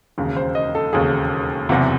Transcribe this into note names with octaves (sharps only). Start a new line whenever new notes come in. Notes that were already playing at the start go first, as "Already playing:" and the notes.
E1 D#2 C#3
C5
D#5
A4
E1 D#2 C#3 G#4
F#1 E2 C3 F#4